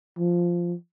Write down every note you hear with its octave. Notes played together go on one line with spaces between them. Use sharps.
F3